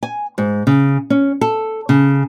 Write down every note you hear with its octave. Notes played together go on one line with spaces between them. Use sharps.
G#5
G#2
C#3
C#4
A4
C#3